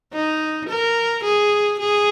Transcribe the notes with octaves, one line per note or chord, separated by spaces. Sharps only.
D#4
A#4
G#4
G#4